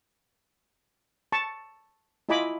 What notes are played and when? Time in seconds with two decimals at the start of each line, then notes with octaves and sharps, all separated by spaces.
1.32 A5 C#6
2.29 E4 F4 D#5 G#5 B5 D6